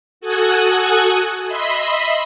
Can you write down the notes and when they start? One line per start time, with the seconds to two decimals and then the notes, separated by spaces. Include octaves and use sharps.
0.21 F#4 A4 G#5 D#6 F#6 G#6
1.48 D#5 E5 B5 C6